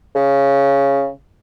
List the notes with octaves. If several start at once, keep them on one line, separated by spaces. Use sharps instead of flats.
C#3